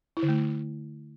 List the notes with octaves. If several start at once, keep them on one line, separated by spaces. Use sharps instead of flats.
E4
D3
A3